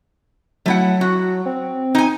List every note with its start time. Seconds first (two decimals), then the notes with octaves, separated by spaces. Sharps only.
0.66 F#3 A3 E4 F#5
1.01 F#4
1.46 C4
1.95 D#4 G#5